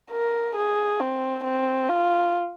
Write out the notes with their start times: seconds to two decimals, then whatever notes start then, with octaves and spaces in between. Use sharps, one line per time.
0.11 A#4
0.56 G#4
1.00 C4
1.44 C4
1.89 F4